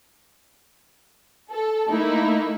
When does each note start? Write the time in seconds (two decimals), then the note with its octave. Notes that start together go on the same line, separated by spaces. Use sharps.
1.51 A4
1.89 A3 A#3 D#4 E4